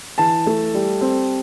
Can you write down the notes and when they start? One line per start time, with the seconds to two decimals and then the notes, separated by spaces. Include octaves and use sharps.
0.18 E3 A5
0.46 A3
0.74 G3
1.01 C4